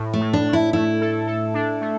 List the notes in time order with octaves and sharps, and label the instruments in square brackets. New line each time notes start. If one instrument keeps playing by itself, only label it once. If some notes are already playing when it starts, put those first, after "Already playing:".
Already playing: [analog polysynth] A2
[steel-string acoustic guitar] A3
[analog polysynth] A2
[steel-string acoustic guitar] D4
[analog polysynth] A2
[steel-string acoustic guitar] E4
[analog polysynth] A3 [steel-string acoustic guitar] E4
[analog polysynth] A4
A4
D4
A3